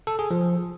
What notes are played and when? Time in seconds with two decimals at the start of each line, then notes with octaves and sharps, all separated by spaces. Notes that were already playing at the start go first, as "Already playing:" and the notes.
0.07 A4
0.19 G#4
0.31 F3